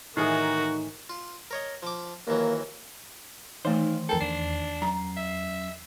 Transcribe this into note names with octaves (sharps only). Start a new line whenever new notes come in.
A2 D#3 E3 D#4 F#4 G#4
F4
A#4 C#5 D#5
F3 D6
D#2 E3 F#3 A#3
D#3 E3 A3 D#4 C5 F5
F2 A4 A#4 G5
E2 D4 C7
F#2 A#5
E5